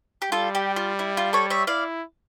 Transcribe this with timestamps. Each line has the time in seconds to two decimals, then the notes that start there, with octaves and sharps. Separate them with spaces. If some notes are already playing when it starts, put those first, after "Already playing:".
0.22 G4
0.31 G3 F4 A4
0.55 G4
0.76 F4
0.99 E4
1.17 F4
1.33 A4 C#5
1.50 C#5 E5
1.67 E4 D5 F5